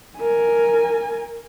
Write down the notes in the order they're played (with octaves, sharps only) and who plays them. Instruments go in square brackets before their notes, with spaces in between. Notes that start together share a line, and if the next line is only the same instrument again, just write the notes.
[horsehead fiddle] A#4 G#5